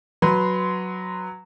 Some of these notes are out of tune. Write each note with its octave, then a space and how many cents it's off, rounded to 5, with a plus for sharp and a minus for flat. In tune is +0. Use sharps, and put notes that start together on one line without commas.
F#3 +0 B4 +0 C6 -15